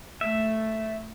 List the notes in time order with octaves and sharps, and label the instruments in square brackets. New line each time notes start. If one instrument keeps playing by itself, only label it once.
[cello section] A3 [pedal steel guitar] E5